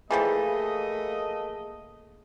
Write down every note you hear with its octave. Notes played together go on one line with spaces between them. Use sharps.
E3 F3 G3 A3 A#3 G#4 D#5